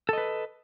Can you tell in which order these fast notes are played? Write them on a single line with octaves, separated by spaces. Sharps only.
A4 D#5 B4